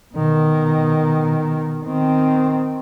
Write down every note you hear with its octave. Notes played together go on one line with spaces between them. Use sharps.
B2 D#3
D#3 C4